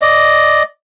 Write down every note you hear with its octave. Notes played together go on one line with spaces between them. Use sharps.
D5 D#5